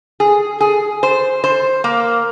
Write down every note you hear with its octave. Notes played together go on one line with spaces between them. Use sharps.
G#4
G#4
C5
C5
A#3